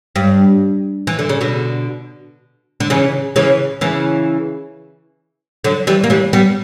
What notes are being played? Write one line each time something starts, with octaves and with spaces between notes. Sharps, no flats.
G2
E3
D3
C#3
B2 D3
D3
C#3 E3
C#3 E3
C#3 E3
D3 F#3
E3 G3
A#3
E3 G3
G3 B3